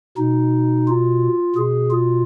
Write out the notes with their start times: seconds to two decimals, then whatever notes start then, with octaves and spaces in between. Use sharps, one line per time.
0.18 B2 D#4
0.88 F4
1.56 B2 G#4
1.90 F4